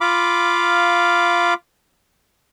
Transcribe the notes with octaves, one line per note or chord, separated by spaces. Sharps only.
F4 F5 B5 D6